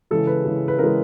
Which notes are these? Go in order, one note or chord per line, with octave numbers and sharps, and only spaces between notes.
C#3 E3 G#3 A4
B4
C#3 E3 G#3
B4
C#3 E3 G#3 A#4